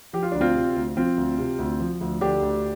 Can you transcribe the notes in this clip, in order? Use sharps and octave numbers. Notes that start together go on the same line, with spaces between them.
F3 G4
F4
D2 D4
C4 F4
C3
D2
F3 C4 F4
D2
C3
D2
F3
D2
D3 D4 G4
D2